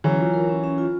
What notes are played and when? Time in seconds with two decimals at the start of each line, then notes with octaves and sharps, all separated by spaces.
0.04 E3 F#3 C#4
0.19 F4
0.33 A#4
0.49 C#4
0.64 C#4
0.78 F4